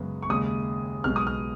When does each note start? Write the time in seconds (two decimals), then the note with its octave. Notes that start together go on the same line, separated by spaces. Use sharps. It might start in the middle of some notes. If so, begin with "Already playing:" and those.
Already playing: F#2 C#3 G#3 B3
0.23 C#6
0.29 D#2 C#3 G#3 D#6
1.04 B1 B2 G#3 B3 F6
1.16 D#6
1.27 F6